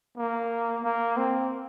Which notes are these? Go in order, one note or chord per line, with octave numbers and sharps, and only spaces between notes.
A#3
A#3
C4